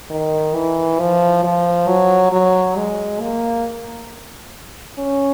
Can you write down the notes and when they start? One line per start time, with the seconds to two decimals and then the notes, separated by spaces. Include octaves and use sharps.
0.10 D#3
0.54 E3
0.99 F3
1.44 F3
1.88 F#3
2.32 F#3
2.76 G#3
3.20 A#3
4.99 C#4